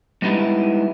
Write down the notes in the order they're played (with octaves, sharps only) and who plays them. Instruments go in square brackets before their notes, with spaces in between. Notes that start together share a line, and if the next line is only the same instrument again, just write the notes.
[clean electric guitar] G3 G#3 B3 D#4 E4 G4